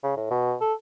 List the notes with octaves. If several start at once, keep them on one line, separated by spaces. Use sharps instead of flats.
C#3
A2
B2
A4